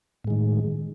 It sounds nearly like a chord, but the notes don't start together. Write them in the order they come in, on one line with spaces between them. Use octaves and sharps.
A2 G#3 D#3